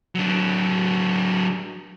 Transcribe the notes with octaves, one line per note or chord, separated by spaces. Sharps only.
F#3 D4